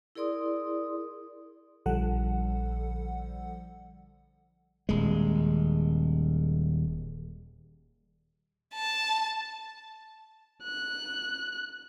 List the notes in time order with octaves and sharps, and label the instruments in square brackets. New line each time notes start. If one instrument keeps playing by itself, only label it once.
[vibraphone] E4 G#4 A#4 D5 C6 D#6
[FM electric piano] A#1 D3 F3 G3 A4 F#5
[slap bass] D#1 G#3
[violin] A5
[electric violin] F#6